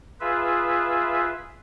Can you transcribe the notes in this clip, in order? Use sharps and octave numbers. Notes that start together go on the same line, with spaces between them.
F4 G#4 B4 E5